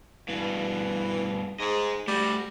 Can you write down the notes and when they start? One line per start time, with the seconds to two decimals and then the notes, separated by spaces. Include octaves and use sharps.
0.28 G2 B2 E3
1.60 G#2 D#5 G#5
2.08 G3 A3 F#4